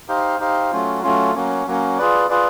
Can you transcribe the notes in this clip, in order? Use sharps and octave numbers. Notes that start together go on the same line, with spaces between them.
D#4 G4 C5 F5
D#4 G4 C5 F5
F#3 A3 C#4 F4
F#3 A3 C#4 F4
F#3 A#3 C#4
F#3 A#3 C#4
F4 G#4 B4 D5
F4 G#4 B4 D5